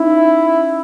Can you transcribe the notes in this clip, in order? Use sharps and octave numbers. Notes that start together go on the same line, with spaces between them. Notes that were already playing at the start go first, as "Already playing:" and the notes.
Already playing: C#4 D#4 E4